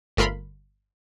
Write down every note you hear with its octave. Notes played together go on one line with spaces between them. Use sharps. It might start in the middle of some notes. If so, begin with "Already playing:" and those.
G1 A3 F4 A#4 B5 C6